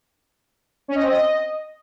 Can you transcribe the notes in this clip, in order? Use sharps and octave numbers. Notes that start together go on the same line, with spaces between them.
C#4
D#5
C4
D#5